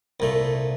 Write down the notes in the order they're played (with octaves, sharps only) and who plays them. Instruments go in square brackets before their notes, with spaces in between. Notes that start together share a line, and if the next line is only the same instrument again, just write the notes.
[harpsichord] C2 A#2 A3